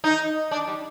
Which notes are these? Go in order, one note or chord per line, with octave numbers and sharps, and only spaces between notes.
D#4
D4
G3